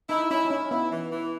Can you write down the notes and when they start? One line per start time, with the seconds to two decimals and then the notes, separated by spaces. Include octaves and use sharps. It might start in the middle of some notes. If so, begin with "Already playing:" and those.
0.09 D#4 E4
0.31 C#4 E4
0.45 D#4
0.50 C#4 E4
0.71 B3 E4
0.91 E3
1.11 E3